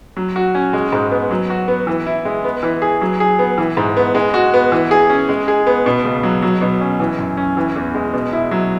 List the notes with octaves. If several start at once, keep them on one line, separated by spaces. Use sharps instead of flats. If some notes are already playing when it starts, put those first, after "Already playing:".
F#3
F#4
C#4
G#3
G#2
B3
F#3
F#4
B3
E3
E4
G#3
B3
E3
G#4
F#3
G#4
B3
E3
G#2
B3
G#3
F#4
B3
E3
G#4
C#4
G#3
G#4
B3
B2
C#2
F#3
F#3
B2
C#4
E3
F#2
C#4
E3
E2
G#3
B2
E4
F#3